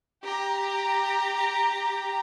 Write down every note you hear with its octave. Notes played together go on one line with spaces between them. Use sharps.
G4 A#5